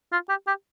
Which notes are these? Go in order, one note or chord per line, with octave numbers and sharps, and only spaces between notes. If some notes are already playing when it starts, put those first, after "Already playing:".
F4
G4
G4